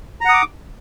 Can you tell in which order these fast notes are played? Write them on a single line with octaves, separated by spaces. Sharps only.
A#5 F#5 D#6 D6